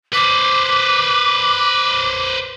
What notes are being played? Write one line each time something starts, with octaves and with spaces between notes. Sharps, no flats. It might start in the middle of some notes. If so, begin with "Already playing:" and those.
B4 C5 D6